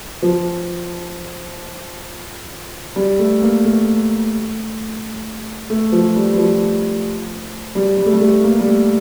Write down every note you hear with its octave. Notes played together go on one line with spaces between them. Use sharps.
F3
G3
A3
A#3
A3
A3
F3
G3
G3
F3
G3
G3
A3
G3
A3
A#3
G3
A3